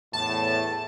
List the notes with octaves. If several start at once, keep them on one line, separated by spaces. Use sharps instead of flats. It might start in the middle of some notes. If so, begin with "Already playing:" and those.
E2 A2 A5